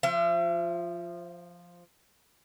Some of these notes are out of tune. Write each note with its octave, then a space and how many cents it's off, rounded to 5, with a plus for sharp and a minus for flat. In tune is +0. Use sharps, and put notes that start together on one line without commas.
F3 +0 E5 +40